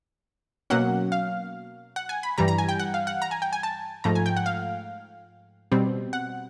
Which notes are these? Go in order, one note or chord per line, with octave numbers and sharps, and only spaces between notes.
B2 F#3 A#3 C#4 F#5
F5
F#5
G#5
B5
G2 E3 G3 A#5
A#5
G#5
G5
F#5
F5
F#5
A#5
G#5
G5
G#5
A5
G#2 F3 A3 A#5
G#5
G5
F#5
F5
B2 G3 C4
F#5